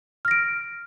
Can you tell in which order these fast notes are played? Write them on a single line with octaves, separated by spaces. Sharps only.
F6 A#6 D7